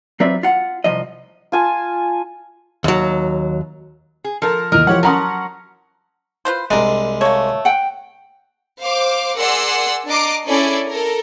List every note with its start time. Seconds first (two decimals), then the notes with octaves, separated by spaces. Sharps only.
0.20 F#3 C4 F4 B4 D5 E5
0.43 F4 F#5
0.84 C2 F3 D#5
1.52 F4 G#5 A5
2.84 D#2 F#3
4.24 G#4
4.42 F3 A4 A#4 A#5
4.72 D#2 E3 A#4 D#5 A#5
4.87 E3 F3 F4 G4 C#5 F#5
5.03 F#3 C#4 A#4 F#5 A5 A#5 C6 D#6
6.45 F4 B4 C5
6.71 C2 G#3 D4 A#4
7.21 A3 A#3 C#5
7.65 F#5 G5
8.80 C5 F5 D6
9.38 G#4 A#4 D5 F#5 C6 E6
10.08 D4 D#5 A#5 D6 C7 D7
10.46 C#4 E4 G#4 A4 D5
10.90 A4 A#4